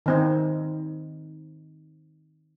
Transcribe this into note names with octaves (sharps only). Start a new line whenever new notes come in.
D#3 C4 D#4